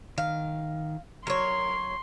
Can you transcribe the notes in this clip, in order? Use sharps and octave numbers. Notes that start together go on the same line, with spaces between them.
D#3 F5
F#3 A#4 C#5 C6